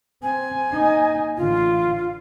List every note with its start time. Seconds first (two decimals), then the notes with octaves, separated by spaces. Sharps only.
0.23 C4 G#5
0.72 A#3 D#4
1.37 A1 D3 F4